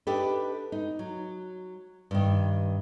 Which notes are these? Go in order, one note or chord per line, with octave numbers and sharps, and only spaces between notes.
D4 D#4 G4 A4 B4
D#4
F#3
G2 D#3